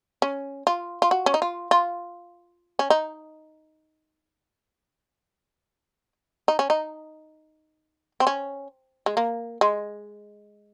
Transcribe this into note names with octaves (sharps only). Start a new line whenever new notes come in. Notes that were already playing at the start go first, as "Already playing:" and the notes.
C#4
F4
F4
F#4
C#4
D#4
F4
F4
C#4
D#4
D#4
C#4
D#4
C4
C#4
G#3
A#3
G#3